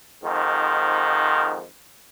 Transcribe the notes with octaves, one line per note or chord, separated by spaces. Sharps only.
F2 G#2 D#3